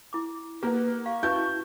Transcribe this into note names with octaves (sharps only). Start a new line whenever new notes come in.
E4 D6
A#3 G4 A#4 B4 F#5
F5 C#6
C#4 E4 F#4 B4 F5 A5 G6